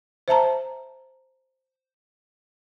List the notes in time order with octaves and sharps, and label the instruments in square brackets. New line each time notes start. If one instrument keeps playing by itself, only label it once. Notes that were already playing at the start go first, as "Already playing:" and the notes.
[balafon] C5 E5 A5 A#5